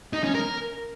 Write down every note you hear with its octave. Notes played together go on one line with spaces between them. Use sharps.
D#4
C#4
A#4